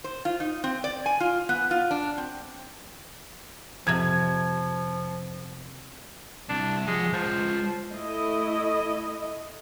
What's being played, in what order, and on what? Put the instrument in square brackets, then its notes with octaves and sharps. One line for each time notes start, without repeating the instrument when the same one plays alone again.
[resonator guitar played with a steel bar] C5
F4
D#4
C4
D5
G#5
F4
B3
F4
D4
C4
[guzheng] F2 C3 [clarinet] F3 [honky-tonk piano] G#6
[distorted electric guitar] C2 [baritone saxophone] D4
[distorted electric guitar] F3 F#5 [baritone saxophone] G#3
[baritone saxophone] F3 [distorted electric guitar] G#3 F4
[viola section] A3 E4 D#5